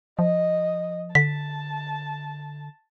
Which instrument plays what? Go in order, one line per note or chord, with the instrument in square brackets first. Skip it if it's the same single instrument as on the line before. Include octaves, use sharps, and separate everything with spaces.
[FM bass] F3 [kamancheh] D#5
[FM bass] D3 [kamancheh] A5 [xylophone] B6